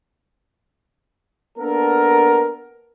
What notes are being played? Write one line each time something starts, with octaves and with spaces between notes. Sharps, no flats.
A#3 B3 D4 A4 A#4